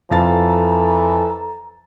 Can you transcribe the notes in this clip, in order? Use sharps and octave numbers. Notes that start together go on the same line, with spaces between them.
F2 E3 A4 F5 A#5 A6